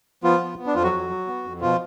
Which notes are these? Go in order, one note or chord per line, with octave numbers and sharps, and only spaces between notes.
F3 B3 F4
B3
B3
D4
F2 F3 F4
F#3 F#4
F2
F#3
B3
F2
B2 F3 F4